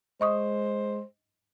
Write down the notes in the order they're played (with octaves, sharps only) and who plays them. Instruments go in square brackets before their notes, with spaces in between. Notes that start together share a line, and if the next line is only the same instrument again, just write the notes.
[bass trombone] G#3 [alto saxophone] C5 [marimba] D#5 C#6 D#6